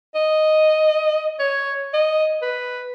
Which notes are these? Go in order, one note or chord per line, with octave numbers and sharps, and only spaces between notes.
D#5
C#5
D#5
B4